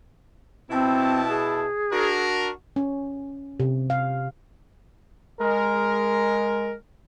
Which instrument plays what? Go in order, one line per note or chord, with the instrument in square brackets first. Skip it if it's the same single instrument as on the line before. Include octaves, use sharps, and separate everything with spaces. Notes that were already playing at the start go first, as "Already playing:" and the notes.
[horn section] B2 E4 A5 [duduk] C4
[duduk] G#4
[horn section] D4 F#4 A#4
[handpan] C#4
C3
F5
[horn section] G#3 A#4